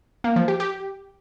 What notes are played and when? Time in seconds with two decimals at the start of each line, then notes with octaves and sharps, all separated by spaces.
0.24 A#3
0.36 F3
0.48 G4
0.60 G4